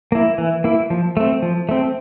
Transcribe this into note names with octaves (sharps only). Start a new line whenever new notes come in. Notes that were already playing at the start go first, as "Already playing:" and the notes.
A#3 E4
E3
A#3 E4
F3
A3 C4
F3
A3 C4